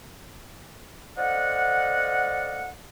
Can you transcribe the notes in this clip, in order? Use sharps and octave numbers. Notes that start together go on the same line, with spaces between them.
A4 C5 D5 D#5 F5 F#5